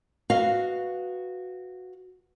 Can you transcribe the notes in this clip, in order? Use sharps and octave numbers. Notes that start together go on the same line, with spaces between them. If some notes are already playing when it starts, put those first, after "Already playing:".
F#4 B4 D#5 F5